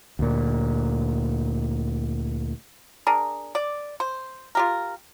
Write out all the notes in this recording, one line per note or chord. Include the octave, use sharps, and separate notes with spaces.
D2 A#2
D4 G#4 A#4
D5
C5
F4 G4 A#4